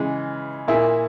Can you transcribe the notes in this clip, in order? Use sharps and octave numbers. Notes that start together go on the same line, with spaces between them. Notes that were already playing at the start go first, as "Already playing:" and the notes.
Already playing: C#3 E3 G#3
A#2 A#3 E4 G#4